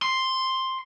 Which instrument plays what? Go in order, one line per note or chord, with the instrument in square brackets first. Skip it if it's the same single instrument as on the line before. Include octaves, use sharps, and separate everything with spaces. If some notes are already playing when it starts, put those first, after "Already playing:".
[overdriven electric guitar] C6